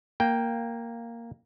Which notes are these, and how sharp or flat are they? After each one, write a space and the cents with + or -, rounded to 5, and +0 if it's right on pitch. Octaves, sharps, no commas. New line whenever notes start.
A#3 -5 G5 +0